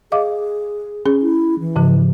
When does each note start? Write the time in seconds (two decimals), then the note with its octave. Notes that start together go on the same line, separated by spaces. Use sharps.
0.12 G#4 D#5 F5 D6
1.06 C#4 G#4
1.22 E4
1.60 E3
1.76 G#2 C#3 F3